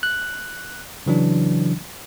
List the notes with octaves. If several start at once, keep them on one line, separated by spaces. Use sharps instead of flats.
F#6
C#3 E3 F#3 D4